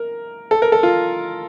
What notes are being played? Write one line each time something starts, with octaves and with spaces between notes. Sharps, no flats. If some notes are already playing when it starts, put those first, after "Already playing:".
Already playing: A#4
A4
A#4
A4
F4